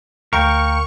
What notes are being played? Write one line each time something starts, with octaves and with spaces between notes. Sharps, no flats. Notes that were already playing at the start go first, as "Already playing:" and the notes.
D2 A#4 F5 G5 C#6